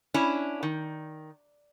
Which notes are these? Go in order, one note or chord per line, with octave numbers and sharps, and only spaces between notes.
C#4 D4 E4
D#3